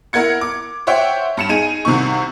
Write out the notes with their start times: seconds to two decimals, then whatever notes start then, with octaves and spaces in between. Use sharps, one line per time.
0.13 E4 A#4 F#5 G#6 C#7
0.41 D6
0.87 C5 C#5 E5 F#5 G5
1.37 G2 C#7 E7
1.49 D#4 G#4 D#7
1.85 C2 C3 D#3 C#6